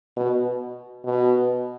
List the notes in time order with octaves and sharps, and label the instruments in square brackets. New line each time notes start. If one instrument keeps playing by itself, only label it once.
[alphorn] B2
B2